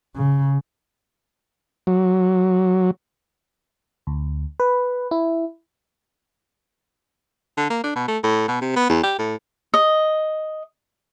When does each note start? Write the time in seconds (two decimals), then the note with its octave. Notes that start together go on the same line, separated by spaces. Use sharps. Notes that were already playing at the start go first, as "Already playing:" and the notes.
0.16 C#3
1.87 F#3
4.07 D2
4.60 B4
5.11 E4
7.58 D3
7.70 A#3
7.84 D4
7.96 B2
8.08 A3
8.24 A2
8.48 B2
8.61 C3
8.76 B3
8.89 E2
9.03 G4
9.19 A2
9.74 D#5